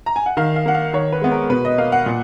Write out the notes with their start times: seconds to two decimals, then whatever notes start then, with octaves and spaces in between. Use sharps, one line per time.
0.06 A#5
0.16 G#5
0.26 F#5
0.37 D#3 F5
0.56 F5
0.66 A#3 F#5
0.75 F5
0.93 D#3 C#5
1.12 B4
1.21 G#3 B3
1.32 A#4
1.50 B2 B4
1.65 D#5
1.78 A#3 F5
1.92 F#5
2.06 A#2